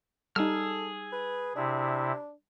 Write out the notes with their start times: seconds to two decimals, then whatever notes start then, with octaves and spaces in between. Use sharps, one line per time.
0.36 G3 D#4 G#4 A4 E6 F6
1.12 B4
1.56 C3 D4 E4